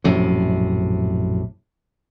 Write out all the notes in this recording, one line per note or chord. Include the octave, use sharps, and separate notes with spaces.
A#1 F#2 A2 C3